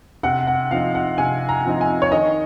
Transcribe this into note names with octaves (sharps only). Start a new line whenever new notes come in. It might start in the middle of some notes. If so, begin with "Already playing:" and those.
C3 F#5
F#5
F3 C4 D#4 F5
F#5
C3 G#5
A#5
F3 C4 D#4
G#5
C#5
D#3 D#5